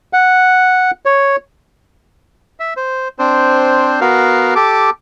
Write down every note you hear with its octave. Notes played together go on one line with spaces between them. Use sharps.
F#5
C#5
E5
C5
C4 D4 C5
B3 F#4 A#4 F5
G4 A4 D6